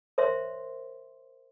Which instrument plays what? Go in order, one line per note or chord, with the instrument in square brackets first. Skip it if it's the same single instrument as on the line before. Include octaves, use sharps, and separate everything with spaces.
[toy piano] A#4 C5 C#5 E5 C6